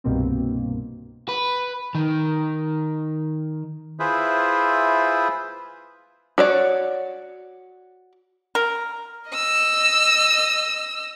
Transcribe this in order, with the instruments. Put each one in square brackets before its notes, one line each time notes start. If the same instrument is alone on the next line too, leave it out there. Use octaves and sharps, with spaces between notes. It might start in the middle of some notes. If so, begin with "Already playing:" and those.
[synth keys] C2 G2 B2 A#3 C4
[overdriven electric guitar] B4
D#3
[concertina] E4 F4 G#4 B4 C5 E5
[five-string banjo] F#4 C#5 D5
[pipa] A#4
[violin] D#5 E6